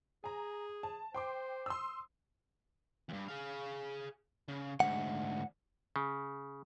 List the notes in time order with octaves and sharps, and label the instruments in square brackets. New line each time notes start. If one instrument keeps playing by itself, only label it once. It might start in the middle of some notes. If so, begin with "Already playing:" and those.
[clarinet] G#4 [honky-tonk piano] G#5 A#5
[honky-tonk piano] A5
[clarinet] C5 [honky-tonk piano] G5 C6 D6
[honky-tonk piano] C6 D#6 E6
[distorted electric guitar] E2 G2
G#4 F5
C#3
[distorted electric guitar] D2 G#2 [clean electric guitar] F#5
[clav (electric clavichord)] C#3